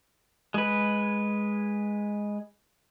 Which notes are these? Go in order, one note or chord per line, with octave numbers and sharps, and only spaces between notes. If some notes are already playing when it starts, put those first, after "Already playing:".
G#3 B4